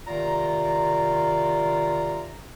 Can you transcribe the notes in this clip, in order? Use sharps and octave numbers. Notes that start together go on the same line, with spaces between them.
C3 D#3 F4 D5 A#5